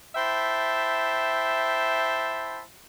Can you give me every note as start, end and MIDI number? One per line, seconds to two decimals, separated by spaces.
0.15 2.61 64
0.15 2.61 72
0.15 2.61 76
0.15 2.61 79
0.15 2.61 81